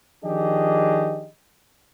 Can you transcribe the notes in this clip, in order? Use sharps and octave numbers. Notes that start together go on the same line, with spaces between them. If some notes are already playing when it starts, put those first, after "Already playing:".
D#3 F3 D4 G4 G#4 D#5